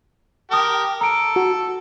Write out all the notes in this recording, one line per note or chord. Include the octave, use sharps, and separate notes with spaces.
G4 A#4 A5 D#6
A4 A#5 D7
F#4